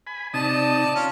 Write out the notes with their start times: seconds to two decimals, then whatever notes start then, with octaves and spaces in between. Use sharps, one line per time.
0.07 G#5 B5
0.34 C3 D#4 D5 A5 D#6
0.95 C#4 F4